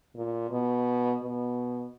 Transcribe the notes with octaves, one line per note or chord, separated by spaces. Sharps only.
A#2
B2
B2